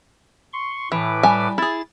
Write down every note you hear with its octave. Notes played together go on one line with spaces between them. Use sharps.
C6 C#6
A2 E3 B4 D6
G3 G#5 A5
E4 G#4 A6